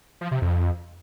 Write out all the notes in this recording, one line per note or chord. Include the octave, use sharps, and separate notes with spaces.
F3
C3
F2